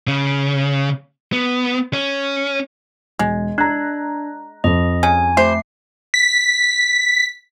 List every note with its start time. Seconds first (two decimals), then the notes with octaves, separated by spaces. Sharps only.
0.08 C#3
1.33 B3
1.93 C#4
3.19 E1 G#3
3.58 D4 A#5 F#6
4.64 F2 D#5
5.03 C#3 G#5
5.37 A3 G4 C5 C7
6.14 B6